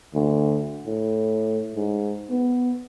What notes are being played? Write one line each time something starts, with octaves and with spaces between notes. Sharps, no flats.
D2
A2
G#2
B3